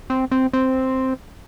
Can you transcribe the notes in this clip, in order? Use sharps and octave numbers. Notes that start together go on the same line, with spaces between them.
C4
C4
C4